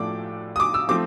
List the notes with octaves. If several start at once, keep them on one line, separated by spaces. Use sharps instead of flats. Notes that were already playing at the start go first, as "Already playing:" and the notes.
Already playing: A2 F3 A3 D4 D6
D#6
D6
E6
F3 A3 C4 D6